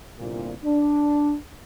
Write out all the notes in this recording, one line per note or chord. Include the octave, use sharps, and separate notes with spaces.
G1 C2 A#2
D4